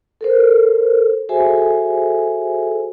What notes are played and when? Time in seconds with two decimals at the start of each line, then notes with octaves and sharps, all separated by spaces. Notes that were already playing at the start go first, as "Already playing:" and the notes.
0.21 A4 A#4 C5
1.29 F#4 G#4 A4 C5 E5 G#5